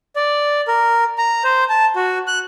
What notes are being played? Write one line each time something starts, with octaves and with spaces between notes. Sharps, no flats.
D5
A#4
A#5
C5
A5
F#4
F#6